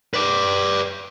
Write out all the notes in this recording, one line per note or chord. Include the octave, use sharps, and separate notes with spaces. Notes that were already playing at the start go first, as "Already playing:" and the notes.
B4 D5